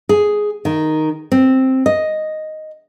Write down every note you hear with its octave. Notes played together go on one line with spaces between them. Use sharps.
G#4
D#3
C4
D#5